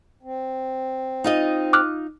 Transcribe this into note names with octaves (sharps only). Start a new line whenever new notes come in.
C4
D#4 F4 D#5
D6 F6 F#6